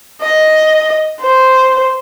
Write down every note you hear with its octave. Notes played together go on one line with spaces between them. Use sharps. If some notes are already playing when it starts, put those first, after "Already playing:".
D#5
C5